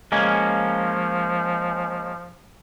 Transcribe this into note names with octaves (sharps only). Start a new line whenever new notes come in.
F3 G#3 A#3 C#4